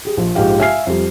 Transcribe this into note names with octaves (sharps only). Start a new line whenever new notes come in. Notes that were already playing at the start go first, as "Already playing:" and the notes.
G4 G#4
A#1 F3
A#1 G#2 G#3 G4 F5
E5 F5 G#5 F6 C7
F2 G3